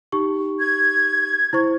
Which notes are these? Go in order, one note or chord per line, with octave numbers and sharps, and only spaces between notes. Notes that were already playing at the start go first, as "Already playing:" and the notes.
D#4 G4 C#6
G#6
E4 C5 C#6